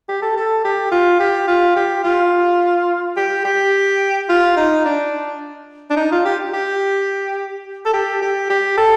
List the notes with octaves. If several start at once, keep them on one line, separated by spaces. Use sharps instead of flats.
G4
A4
A4
G4
F4
G4
F4
G4
F4
G4
G4
F4
D#4
D4
D4
D#4
F4
G4
G4
A4
G4
G4
G4
A4